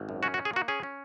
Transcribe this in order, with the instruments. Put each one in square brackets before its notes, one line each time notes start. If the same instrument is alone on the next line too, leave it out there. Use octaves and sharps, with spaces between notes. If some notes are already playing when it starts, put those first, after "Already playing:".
Already playing: [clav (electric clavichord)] G#1
F#2
C#4 F#4
F#4
C#4
G#4
A#3 F#4
C#4 G#4
C#4